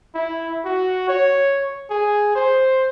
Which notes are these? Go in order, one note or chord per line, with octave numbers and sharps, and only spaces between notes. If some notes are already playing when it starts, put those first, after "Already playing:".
E4
F#4
C#5
G#4
C5